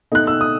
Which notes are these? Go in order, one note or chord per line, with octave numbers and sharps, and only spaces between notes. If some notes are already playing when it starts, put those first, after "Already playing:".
B2 A3 D#4 F#6
E6
D#6